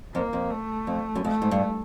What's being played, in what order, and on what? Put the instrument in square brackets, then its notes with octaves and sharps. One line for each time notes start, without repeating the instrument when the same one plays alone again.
[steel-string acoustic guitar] F2 [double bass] A#3
[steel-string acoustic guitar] F2
[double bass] A3
[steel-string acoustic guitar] F2
F#2
[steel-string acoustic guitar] F2 [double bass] A3
[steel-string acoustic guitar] G#2
G2